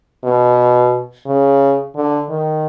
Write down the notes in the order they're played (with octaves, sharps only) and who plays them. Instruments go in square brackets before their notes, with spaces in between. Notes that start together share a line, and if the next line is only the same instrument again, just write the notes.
[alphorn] B2
C#3
D3
D#3